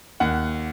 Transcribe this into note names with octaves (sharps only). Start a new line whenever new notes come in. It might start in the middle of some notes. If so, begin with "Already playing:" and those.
D#2 F#5